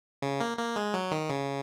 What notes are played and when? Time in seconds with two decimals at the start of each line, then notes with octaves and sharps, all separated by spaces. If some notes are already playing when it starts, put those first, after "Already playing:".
0.22 C#3
0.40 A#3
0.58 A#3
0.76 G#3
0.94 F#3
1.11 D#3
1.30 C#3